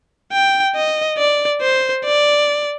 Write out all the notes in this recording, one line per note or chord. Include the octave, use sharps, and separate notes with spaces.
G5
D#5
D5
C5
D5